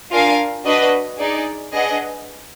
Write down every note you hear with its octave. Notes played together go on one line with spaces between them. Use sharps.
D4 F4 A#4 F5 G#5
D4 F#4 B4 D#5
D#4 G#4 D5
D4 G#4 B4 D#5 F#5